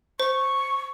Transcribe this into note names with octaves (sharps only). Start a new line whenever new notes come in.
C5 C#6